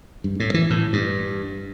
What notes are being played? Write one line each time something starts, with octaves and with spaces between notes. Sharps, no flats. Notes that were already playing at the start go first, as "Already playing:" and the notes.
G2
A2
E3
A2
G2